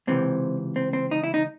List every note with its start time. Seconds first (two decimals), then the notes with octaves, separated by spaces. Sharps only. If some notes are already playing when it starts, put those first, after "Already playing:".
0.07 C#2 C3 E3 C4
0.76 C4
0.93 C4
1.11 D#4
1.23 E4
1.34 D#4